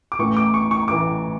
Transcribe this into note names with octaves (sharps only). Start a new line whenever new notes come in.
D6
A1 A2 E3 A3 C#6
D6
C#6
C#6
A1 A2 E3 A3 D6